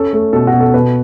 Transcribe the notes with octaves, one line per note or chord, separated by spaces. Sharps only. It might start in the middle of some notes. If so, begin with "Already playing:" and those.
Already playing: C#4 A4
A3
B2 A4
F#4
B2
A4
B2 B4